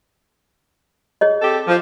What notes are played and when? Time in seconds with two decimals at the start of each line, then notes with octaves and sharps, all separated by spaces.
1.21 G#4 C#5 D#5
1.42 C4 G4 A4
1.68 F3